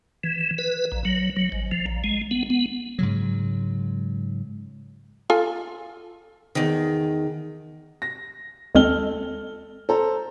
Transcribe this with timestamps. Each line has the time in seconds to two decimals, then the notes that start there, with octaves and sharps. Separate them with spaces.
0.24 E3
0.58 B4
0.92 A#1
1.05 F#3
1.36 F#3
1.52 G#1
1.72 F3
1.86 A#1
2.04 G#3
2.31 B3
2.50 B3
2.99 G#2 C#3 F#3
5.30 F4 A4 G#5
6.55 E2 D#3
8.02 A#6
8.75 D#2 G#3 C4 A4 F6 G7
9.89 A4 C5 A#5